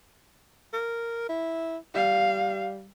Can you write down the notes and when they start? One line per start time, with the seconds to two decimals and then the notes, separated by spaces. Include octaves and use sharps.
0.73 A#4
1.29 E4
1.95 G3 F5